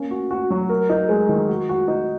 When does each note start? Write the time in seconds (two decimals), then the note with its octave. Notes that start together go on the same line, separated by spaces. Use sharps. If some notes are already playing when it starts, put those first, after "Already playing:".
Already playing: A#3 C#4
0.11 F#4
0.31 F#4
0.51 F#3
0.69 A#4
0.90 D#4
1.09 G#3
1.29 D#3
1.48 F#4
1.69 F#4
1.88 D#4